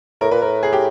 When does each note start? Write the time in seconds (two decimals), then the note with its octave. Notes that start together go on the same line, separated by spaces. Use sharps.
0.21 A2 A#4
0.31 A#2 B4
0.42 A2 A#4
0.63 G#4
0.73 G4